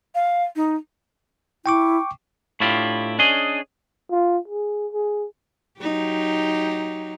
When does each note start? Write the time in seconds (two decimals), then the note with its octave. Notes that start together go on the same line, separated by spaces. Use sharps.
0.15 F5
0.56 D#4
1.66 E4 G5 C#6 D6
2.60 A2 D4 E4 F4 G4
3.19 C#4 D4 G#4 D#5
4.11 F4
4.48 G#4
4.92 G#4
5.80 F#3 D#4 G4